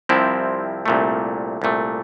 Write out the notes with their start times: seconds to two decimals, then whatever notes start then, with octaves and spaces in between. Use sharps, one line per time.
0.09 C2 C3 F3 C4 E4
0.86 C2 A#2 A3
1.62 C2 A#2 A3